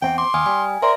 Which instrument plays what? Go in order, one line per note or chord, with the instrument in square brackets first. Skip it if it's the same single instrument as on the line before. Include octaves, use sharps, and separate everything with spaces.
[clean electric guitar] E2 C4 [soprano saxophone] G5
[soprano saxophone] C6 [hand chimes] D6
[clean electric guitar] D#2 [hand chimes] G#5 D#6 F6
[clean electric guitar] G3 [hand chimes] G#5
[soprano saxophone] A#4 [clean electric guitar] C5 [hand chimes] D5 E5